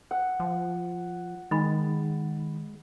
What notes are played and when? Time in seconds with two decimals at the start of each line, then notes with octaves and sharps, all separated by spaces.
0.11 F#5
0.40 F3
1.51 D#3 G#3 B5 A6